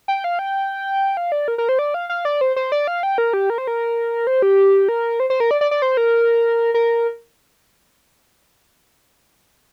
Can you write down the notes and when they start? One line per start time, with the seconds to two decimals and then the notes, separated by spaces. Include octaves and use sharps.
0.08 G5
0.24 F5
0.39 G5
1.17 F5
1.32 D5
1.48 A#4
1.58 A#4
1.69 C5
1.79 D5
1.94 F5
2.09 F5
2.25 D5
2.41 C5
2.56 C5
2.72 D5
2.87 F5
3.03 G5
3.18 A#4
3.33 G4
3.50 A#4
3.58 C5
3.67 A#4
4.27 C5
4.42 G4
4.89 A#4
5.20 C5
5.30 C5
5.40 A#4
5.51 D5
5.61 D5
5.71 D5
5.82 C5
5.97 A#4
6.74 A#4